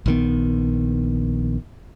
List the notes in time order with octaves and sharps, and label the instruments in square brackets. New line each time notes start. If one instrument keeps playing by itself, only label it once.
[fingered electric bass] A#1 D#3 B3